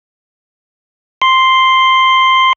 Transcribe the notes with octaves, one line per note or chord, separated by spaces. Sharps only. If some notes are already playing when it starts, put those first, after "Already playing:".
C6